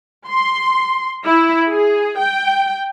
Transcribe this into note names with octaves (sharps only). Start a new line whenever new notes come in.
C6
E4
G#4
G5